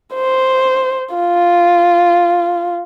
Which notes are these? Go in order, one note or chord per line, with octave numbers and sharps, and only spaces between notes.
C5
F4